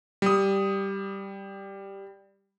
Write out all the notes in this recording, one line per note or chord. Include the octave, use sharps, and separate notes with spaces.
G3 D#6